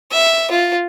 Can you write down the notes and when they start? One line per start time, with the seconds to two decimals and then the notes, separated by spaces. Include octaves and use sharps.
0.12 E5
0.51 F4